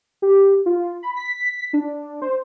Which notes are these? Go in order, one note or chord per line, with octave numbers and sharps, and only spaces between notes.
G4
F4
B5
B6
D4
C5